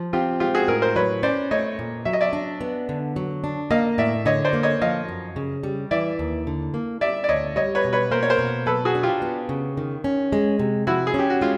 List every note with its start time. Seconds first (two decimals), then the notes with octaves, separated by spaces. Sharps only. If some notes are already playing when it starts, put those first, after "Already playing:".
Already playing: F3
0.13 C4 F4 G4
0.40 G#3 F4 G4
0.54 F#4 G#4
0.68 A2 G#4 A#4
0.82 A#4 C5
0.96 F#3 B4 C#5
1.23 C#4 C5 D5
1.51 A3 C#5 D#5
1.79 A#2
2.05 F#3 E5
2.13 D#5
2.21 D5 E5
2.33 D4
2.61 B3
2.89 D3
3.16 F#3
3.44 D4
3.71 A#3 D#5 F5
3.98 A2 D5 E5
4.26 D3 C#5 D#5
4.44 C5 D5
4.53 A#3
4.63 C#5 D#5
4.82 F3 D#5 F5
5.08 F#2
5.36 C#3
5.63 G3
5.91 E3 D5 E5
6.19 D#2
6.47 D3
6.74 A#3
7.01 G3 D5 E5
7.24 D5
7.29 D2 C#5 D#5
7.56 G3 C#5 D#5
7.75 B4 C#5
7.85 B2
7.93 B4 C#5
8.11 A#3 A#4 C5
8.23 C#5
8.30 A#4 C5
8.39 B2
8.66 F#3 A4 B4
8.85 F#4 G#4
8.95 D4
9.03 F4 G4
9.22 B3
9.49 C#3
9.77 D#3
10.04 C#4
10.32 G#3
10.59 C3
10.87 F3 E4 F#4
11.07 G#4
11.14 C#4
11.19 G4
11.30 F#4
11.41 G#3 F4